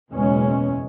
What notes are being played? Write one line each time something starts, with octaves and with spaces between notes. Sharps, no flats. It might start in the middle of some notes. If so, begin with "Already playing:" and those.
F#1 E2 B2 G#3 C#4